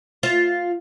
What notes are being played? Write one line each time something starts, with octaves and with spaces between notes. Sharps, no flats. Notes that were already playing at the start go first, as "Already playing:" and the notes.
F4 C5